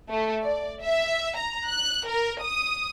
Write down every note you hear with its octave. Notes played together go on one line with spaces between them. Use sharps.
A3
D5
E5
A#5
F#6
A#4
D#6